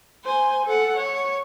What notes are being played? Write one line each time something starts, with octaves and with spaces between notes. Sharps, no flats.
C5 G#5
A4 F#5
C#5